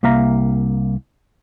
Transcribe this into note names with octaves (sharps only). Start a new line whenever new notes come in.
C2 A#3 E5 F5 A#5